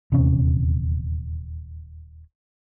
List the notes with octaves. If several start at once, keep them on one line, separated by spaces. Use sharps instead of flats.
D#1 E2 C3 C#4